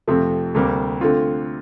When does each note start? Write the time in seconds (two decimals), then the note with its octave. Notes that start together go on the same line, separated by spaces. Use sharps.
0.07 F2 C3 F3 A3 C4
0.54 D2 C3 G3 A#3
1.01 D3 A3 C4 F4